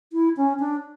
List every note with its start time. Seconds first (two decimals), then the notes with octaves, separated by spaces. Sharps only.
0.13 E4
0.37 C#4
0.60 D4